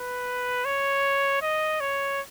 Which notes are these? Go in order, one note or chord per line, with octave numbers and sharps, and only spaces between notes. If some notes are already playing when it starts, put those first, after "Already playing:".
Already playing: B4
C#5
D#5
C#5